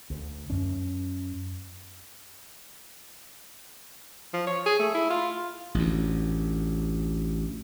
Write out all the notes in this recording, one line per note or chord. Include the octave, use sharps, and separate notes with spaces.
D2
F#2 C#4
F3
C#5
G#4
A3
E4
F4
A1 D2